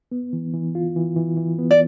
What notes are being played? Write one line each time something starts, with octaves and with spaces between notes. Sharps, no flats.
B3
E3
E3
F4
E3
E3
E3
B3
D5